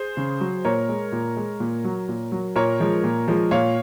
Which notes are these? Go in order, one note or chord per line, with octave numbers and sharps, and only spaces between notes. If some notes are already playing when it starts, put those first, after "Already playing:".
Already playing: G#4 C5
C#3
F#3
A#2 A#4 C#5
G#3
A#2
G#3
A#2
F#3
A#2
F#3
A#2 A#4 C#5
F3 G#3
A#2
F3 G#3
A#2 C#5 F5